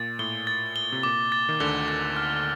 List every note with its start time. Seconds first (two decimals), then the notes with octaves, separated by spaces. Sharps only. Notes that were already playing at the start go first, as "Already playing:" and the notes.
Already playing: A#2 A6
0.19 A2 G7
0.47 A6
0.76 G7
0.92 C3
1.03 A#2 D6
1.32 A6
1.49 D#3
1.60 D2 D3 G7
1.88 A6
2.16 F6